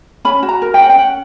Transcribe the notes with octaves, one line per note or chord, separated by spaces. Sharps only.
C#4 B5
F#4
A#5
A#4
G5
C#4 F#5
G5
C#4 F#5